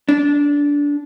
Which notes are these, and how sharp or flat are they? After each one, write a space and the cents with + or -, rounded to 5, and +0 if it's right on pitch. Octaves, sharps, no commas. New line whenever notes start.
D4 -20